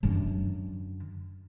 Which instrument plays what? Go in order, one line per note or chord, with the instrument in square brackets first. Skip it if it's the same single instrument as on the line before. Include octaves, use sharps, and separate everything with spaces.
[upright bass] F#2 D3